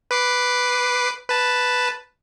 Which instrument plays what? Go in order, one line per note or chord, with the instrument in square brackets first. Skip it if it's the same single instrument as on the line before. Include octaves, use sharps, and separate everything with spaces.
[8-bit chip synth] B4 D6 C7
B4 A5